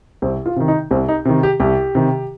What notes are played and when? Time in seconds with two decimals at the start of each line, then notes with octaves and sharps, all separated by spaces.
0.22 C2 C4
0.46 F4
0.56 C3 D#3
0.68 D#4
0.91 C2 C4
1.08 D#4
1.25 C3 D#3
1.43 G4
1.60 C2 G4
1.95 C3 D#3